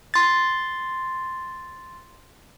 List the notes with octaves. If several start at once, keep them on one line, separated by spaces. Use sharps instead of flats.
C6 A6